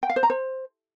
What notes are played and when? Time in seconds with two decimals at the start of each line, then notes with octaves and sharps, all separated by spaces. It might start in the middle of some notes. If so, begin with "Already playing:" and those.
0.03 G5
0.10 F5
0.16 C5
0.23 A#5
0.30 C5